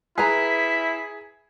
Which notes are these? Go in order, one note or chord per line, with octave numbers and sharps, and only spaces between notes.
E4 G#4 B4 A#5 B6